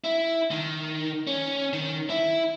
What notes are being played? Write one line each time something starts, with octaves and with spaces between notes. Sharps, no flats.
E4
D#3
C#4
D#3
E4